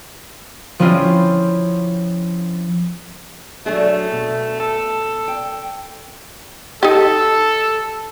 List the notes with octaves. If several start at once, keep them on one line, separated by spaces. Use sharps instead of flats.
F3 C4 C#4 E4 F4
F#3 A3 D4 G#4
B2
A4
G5
D#4 G4 A4